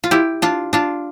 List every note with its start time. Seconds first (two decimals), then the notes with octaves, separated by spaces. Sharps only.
0.04 F4
0.11 E4 G4
0.42 D4 F4
0.73 D4 F4